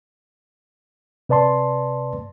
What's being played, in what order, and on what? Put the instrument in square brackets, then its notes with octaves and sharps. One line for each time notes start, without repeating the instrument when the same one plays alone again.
[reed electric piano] C3 B4 D5 A5 C6